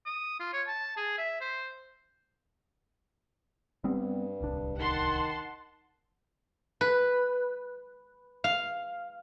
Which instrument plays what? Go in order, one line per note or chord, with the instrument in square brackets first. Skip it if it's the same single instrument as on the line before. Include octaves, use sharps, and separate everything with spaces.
[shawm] D#6
F4
C#5
A5
G#4
E5
C5
[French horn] G2 [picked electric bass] G3 B3 C4
[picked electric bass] D1 C2 D4
[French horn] D#3 [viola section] F#5 A5 C6
[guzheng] B4
F5